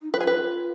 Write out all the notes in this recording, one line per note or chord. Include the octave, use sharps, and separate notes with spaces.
D#4
F4 B4
G#4
B4